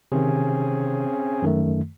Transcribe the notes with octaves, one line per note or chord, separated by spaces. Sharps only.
C3 D#3 C4 C#4 G#4
F#2 D#3 A3